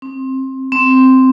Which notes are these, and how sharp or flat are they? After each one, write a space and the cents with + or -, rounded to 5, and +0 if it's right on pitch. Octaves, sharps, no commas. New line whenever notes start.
C4 +20
C4 -5